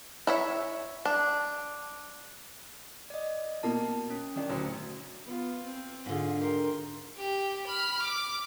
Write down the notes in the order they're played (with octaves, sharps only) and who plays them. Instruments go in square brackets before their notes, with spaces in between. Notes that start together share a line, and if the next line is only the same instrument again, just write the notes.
[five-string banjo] E4 C#5 E5
D4
[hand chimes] D5 D#5
[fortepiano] B2 A#3 [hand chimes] A5
[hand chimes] C#4
[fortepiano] D#3 D4
D2 A2 F#3
[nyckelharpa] B3 F4
C4
[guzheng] G#2 D3 [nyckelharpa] F4 G#4
[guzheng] G4 [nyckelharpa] A#4 C6
[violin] G4
B5 F6
D6